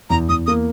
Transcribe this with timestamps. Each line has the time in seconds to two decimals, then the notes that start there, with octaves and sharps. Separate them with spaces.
0.10 E2 A#5
0.29 E2 D#6
0.46 A#3 D#6